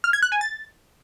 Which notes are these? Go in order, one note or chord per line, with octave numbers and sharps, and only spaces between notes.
F6
G#6
F#6
G#5
A6